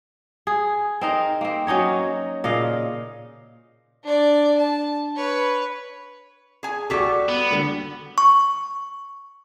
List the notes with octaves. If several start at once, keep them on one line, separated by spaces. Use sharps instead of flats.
G#4
C4 D#4 A#4
A#3 C4
F#3 C#4 D#4 C#5
A#2 C#3 D#5 F5
D4 D5
A5
B4 C#5
G#4 G#5
G3 F#4 G4 A4 C#6 D6
B3 F#4
D3 G3
C#6